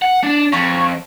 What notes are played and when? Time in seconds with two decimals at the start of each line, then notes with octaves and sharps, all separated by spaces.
0.02 F#5
0.23 D4
0.52 F2 C#6